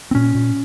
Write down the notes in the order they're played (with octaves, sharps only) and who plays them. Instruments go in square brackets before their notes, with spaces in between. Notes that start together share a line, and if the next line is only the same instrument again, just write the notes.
[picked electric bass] C4
A#2 C#4
A#2